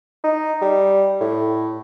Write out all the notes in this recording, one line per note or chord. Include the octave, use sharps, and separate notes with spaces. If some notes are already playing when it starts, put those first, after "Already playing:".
D#4
G3
A2